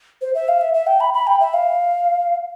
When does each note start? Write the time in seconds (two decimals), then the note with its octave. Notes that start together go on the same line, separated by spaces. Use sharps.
0.22 C5
0.35 E5
0.48 F5
0.61 E5
0.74 E5
0.87 G5
1.00 B5
1.14 B5
1.27 G5
1.40 E5
1.54 F5